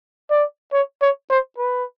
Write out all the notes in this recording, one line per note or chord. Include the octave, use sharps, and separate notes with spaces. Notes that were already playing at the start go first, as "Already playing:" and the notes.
D5
C#5
C#5
C5
B4